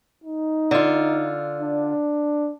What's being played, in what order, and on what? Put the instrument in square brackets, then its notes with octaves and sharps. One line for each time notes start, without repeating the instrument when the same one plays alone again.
[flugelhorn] D#4
[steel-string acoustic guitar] D3 F4
[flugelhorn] D4